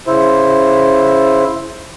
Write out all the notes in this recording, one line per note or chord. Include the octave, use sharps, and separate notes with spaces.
C#3 E4 C5